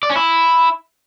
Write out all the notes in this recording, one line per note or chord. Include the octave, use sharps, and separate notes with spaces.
D5
C#4
E4